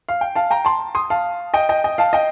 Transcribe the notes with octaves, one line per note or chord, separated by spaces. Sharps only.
F5
G5
F5 A5
G5 A#5
A5 C6
C6 D#6
F5 A5
D#5 G5
D#5 G5
D#5 G5
F5 A5
D#5 G5